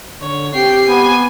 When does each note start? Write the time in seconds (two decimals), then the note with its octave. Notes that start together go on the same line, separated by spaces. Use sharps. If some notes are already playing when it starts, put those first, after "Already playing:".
0.21 D3 C#5
0.54 C4 G4 G5 C7
0.88 B3 G#5